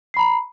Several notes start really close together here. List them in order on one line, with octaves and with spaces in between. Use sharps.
C7 B5 A#5